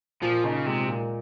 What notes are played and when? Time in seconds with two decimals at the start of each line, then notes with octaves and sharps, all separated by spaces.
0.22 A#2 F3
0.44 C#3 D#4
0.66 C3 G#3
0.88 A#2